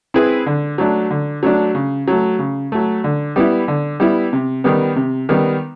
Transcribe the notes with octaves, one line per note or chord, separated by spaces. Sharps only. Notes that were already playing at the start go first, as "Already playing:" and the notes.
C4 E4 G#4 B4
D3
F#3 A3 D4
D3
F#3 A3 D4
C#3
F#3 A3
C#3
F#3 A3
D3
G3 B3 E4
D3
G3 B3 E4
C3
D#3 G3 B3
C3
D#3 G3 B3